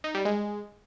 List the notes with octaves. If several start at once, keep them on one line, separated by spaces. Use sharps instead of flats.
D#4
G3
G#3